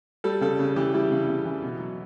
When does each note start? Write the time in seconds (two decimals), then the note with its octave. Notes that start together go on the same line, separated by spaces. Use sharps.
0.24 G3 A4
0.41 C#3 A4
0.59 C#3
0.76 E3 G4
0.94 G3 E4
1.11 C#3
1.28 C#3
1.45 E3
1.62 B2
1.80 F#3